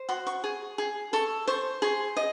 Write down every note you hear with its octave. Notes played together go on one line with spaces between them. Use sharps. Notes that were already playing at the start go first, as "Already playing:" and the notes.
Already playing: C5
F#4 C6
C#6
G#4
G#4
A4 C#6
C5 C#6
G#4 C6
D#5